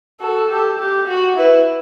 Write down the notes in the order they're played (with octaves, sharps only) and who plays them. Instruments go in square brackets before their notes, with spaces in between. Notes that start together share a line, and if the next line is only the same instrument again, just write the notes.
[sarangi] F#4 [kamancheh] A4
[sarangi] G4
G4
F#4
[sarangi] E4 [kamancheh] B4